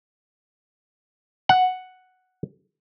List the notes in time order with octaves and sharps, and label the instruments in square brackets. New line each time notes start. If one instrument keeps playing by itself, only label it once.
[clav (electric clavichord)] F#5